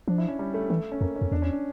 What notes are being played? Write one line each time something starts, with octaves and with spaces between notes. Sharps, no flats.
F3 D4
E4
C#4
G3
A3
E3 A3
C#4
F2 A#3
C#4
F2
E2 D4
C#4
D4